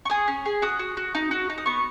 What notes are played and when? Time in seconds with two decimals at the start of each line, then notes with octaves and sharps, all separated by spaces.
0.05 C#6
0.10 G#4 D#6
0.28 C#4
0.46 G#4
0.62 F#4 D#6
0.79 F#4
0.97 F#4
1.15 D#4
1.31 F#4
1.50 D#4
1.58 D#6
1.66 B3 C#6